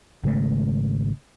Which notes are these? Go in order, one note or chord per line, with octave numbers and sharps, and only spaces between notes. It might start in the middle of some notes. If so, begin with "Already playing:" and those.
G#1 C#3 G#3 A3